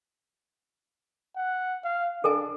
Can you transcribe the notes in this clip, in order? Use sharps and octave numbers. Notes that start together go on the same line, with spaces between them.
F#5
F5
D4 A4 A#4 G#5